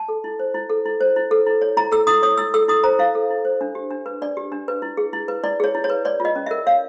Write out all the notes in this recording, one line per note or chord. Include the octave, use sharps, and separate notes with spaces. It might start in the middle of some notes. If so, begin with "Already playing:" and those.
Already playing: A5
A4
E4
C5
E4
A4
E4
C5
E4
A4
E4
C#5
E4 A#5
A4 E6
E4 D#6
C#5 D#6
E4 E6
A4 E6
E4 D#6
C5 A#5
E4 F5
A4
E4
C5
D4
G4
D4
B4
D4 D5
G4
D4
B4
E4
G#4
E4
B4
E4 D5
G#4 C#5
E4
C#5
B4
C#5 D5
F4
D#5
C#4
A#4 E5
C#5 F5